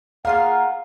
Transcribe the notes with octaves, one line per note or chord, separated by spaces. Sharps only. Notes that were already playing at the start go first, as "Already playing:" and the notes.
A#3 F4 G#4 A#4 F5 F#5